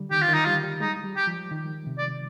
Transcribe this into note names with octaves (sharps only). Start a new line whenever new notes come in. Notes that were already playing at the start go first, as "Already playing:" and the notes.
Already playing: D3 G3
D#3 G4
F4
D#3
D#4
G3 F4
G3
G#3 D#4
G3
G4
F3
D#3
C3
D5